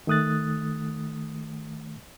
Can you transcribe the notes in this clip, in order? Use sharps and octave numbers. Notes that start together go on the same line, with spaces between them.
D#3 A3 D#6 F#6 A6